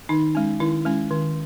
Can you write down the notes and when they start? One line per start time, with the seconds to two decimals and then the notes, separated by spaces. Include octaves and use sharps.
0.09 D#3 D#4
0.35 G#3 C#4
0.60 D#3 E4
0.85 G#3 C#4
1.11 D#3